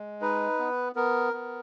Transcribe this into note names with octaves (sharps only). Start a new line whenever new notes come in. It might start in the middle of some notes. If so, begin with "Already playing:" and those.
Already playing: G#3
D#4 B4
B3
B3 A#4
B3